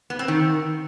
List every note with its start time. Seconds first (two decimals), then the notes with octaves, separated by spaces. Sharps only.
0.10 B3
0.19 C4
0.28 D#3